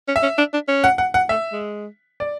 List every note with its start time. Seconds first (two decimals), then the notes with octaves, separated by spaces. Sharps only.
0.08 C#4
0.16 E5
0.23 C#4
0.38 D4
0.53 D4
0.68 C#4
0.84 F#5
0.98 F#5
1.14 F#5
1.29 A3 E5
1.52 G#3
2.20 D5